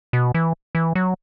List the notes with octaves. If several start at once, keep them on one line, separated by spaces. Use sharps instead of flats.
B2
E3
E3
F#3